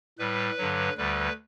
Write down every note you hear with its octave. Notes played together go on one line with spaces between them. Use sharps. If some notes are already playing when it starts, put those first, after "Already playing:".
A2 G3 B4
G2 D3 F#3
D2 D3 G3 B4